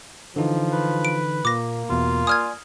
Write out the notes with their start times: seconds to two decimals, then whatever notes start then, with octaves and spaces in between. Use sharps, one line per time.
0.36 D3 E3 F3 D#4
0.73 B4
1.05 D7
1.45 A#2 A#3 D6 A#6
1.90 E2 B2 F4
2.27 D5 G#5 D#6 F6 G#6